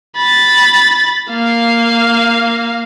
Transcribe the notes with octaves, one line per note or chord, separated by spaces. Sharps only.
B5 A6
A#3 F5